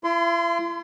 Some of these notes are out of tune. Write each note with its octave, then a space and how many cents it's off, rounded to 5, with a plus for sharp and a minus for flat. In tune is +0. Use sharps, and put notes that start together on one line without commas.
E4 +45 C6 -25